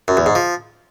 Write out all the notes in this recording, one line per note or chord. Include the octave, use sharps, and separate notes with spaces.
F#2
E2
G#2
F3